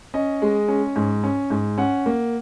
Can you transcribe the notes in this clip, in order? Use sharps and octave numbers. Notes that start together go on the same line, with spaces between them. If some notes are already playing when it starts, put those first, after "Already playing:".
C#4 D#5
G#3
C#4
G#2
C#4
G#2
C#4 F#5
A#3